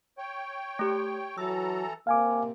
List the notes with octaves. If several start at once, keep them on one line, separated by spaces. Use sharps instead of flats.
C#5 G5
A3 G4
E3 F#3 A4 A#5 E6
C3 A#3 F5 G#5 D6